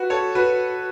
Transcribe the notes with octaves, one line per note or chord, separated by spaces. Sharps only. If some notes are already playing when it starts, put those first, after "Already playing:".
Already playing: F#4 B4
A4 C#5
F#4 B4